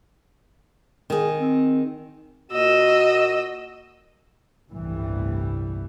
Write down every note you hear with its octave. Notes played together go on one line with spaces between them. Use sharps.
D#3 G#4
C4
A#2 F#4 D#5 E6
G1 C2 A2 E3 G3